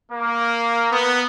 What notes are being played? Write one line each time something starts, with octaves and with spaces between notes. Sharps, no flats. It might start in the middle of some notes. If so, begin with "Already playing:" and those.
A#3
B3